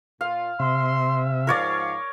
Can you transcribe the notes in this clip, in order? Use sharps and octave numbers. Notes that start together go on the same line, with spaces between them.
A#2 F4 F5
C3 E5 C6
G#2 F3 A#4 C#5 D5 F5